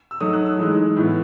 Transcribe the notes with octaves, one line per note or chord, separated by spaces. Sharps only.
E6
F#3 A3 D#4 D#6
F#6
E6
E3 G#3 D#4
A2 E3 B3